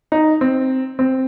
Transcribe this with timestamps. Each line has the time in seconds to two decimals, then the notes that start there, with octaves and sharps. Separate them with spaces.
0.12 D#4
0.41 C4
0.99 C4